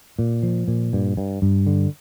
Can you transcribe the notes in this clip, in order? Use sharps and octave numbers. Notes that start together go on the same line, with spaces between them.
A#2
F3
A#2
G2
G2
G2
D3